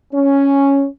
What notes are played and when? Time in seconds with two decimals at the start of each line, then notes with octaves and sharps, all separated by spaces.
0.13 C#4